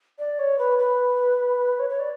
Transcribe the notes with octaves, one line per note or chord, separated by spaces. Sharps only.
D5
C#5
B4
B4
C#5
C#5
D5